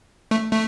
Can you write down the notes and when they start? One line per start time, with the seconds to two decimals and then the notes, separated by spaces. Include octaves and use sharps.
0.31 A3
0.52 A3